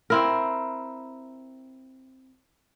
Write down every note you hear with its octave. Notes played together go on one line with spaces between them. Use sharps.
C4 E4 A#4